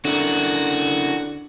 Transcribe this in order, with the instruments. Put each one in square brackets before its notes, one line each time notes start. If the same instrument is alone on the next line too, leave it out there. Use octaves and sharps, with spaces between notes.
[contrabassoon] D3 [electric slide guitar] C#4 E4 A#4 [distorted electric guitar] F#4